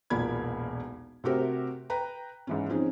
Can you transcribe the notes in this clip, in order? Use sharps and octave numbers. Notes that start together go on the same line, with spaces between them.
E1 B1 A#2 A#3 B5 G#6
C3 A3 F#4 G4 A#4 C5
B4 G5 A#5
G#2 E3 C#4
F3 C4 C#4 D#4 G#4